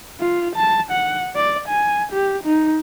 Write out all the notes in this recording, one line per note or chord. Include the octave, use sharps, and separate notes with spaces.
F4
A5
F#5
D5
G#5
G4
D#4